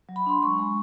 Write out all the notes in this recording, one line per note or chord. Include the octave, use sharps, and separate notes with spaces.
F#3
B5
D4 C6
G#3 C#6
G#3